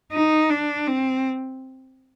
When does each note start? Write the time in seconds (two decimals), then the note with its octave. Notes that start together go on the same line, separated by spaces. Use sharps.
0.13 D#4
0.50 D4
0.87 C4